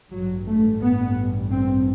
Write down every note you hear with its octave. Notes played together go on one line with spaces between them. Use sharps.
A1 G2 F#3
A3
B3
C4